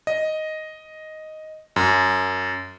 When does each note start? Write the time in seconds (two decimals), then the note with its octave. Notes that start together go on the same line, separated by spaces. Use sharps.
0.07 D#5
1.76 F#2